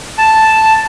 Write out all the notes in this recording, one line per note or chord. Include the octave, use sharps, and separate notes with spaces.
A5